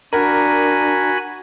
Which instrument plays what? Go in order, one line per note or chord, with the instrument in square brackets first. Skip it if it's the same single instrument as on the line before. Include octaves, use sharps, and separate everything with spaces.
[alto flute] D4 [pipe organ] F#4 G#5 B5 [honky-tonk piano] A#4